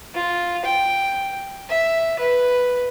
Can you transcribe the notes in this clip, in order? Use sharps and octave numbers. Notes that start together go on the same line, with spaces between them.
F4
G5
E5
B4